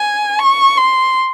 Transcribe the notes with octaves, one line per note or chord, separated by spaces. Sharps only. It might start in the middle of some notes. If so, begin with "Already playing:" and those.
Already playing: G#5
C#6
C6